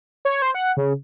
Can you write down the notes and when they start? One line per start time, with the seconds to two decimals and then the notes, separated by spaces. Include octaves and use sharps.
0.25 C#5
0.42 C5
0.55 F#5
0.77 C#3